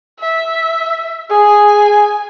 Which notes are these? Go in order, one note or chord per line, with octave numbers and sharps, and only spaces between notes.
E5
G#4 G#5